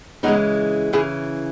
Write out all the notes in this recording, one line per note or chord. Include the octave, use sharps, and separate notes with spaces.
C#3 E3 G#3 B3 D#4
C#3 E3 E4 G#4